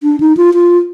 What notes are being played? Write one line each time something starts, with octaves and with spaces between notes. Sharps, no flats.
D4
D#4
F4
F4